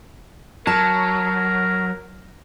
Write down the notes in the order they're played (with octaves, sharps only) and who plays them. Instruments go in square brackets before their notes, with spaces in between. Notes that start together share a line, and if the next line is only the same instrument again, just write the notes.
[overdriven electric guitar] F#3 [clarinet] A#4 [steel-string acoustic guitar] A5